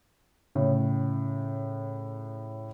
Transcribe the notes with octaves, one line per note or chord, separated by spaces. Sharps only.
A2 C#3